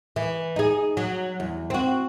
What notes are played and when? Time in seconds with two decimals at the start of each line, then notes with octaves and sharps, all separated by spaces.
0.16 E3
0.56 D#4 G#4
0.97 F#3
1.40 E2
1.70 C4 F#4